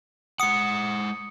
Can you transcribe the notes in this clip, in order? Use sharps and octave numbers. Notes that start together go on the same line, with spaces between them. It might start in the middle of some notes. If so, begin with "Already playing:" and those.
G#3 F#5 D#6 C#7